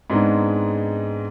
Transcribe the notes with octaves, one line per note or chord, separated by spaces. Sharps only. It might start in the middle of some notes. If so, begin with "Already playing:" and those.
G#2 G#3 B3 C4 D4 D#4